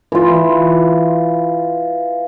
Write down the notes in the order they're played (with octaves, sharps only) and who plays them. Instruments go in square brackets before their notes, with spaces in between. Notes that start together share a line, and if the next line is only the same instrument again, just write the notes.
[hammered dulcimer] E3 F4